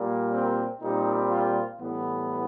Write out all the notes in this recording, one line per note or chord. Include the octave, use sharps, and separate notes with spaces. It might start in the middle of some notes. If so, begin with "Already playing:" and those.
Already playing: A#2 G3 A#3
C4
A#2 G3 C4 D#4
F4
A2 E3 G3 B3